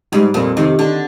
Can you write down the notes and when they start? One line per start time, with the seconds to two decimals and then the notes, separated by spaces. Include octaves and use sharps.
0.12 G#2 G3
0.34 F2 A#2
0.57 C3 D#3
0.79 D3 D4